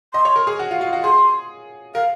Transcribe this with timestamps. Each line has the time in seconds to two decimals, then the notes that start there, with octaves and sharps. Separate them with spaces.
0.14 D#5 C6
0.25 C#5
0.36 A#4
0.47 G#4
0.59 F#4
0.71 F4
0.81 F4
0.93 F#4
1.04 G#4 C6
1.95 A#4 F5